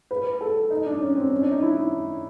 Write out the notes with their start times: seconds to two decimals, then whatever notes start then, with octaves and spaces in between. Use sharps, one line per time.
0.11 B4
0.41 A4
0.70 D#4
0.86 D4
1.01 C#4
1.16 C4
1.31 C#4
1.42 D4
1.52 D#4
1.62 E4